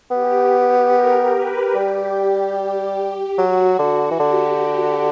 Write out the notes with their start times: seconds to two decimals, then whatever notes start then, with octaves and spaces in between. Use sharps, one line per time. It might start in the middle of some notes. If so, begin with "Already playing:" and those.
0.11 B3 G4
0.92 A#4
1.33 B4
1.74 G3 G4
3.38 F#3 F#4
3.79 D3
4.11 E3
4.20 D3 G4